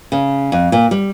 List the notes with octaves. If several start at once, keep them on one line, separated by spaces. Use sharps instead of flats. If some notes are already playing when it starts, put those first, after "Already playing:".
C#3
F2
A#2
G3